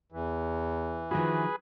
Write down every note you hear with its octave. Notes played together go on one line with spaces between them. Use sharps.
E2 E3
D#3 F3 F#4 G#4 B4